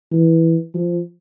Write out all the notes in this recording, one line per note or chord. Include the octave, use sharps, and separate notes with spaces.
E3
F3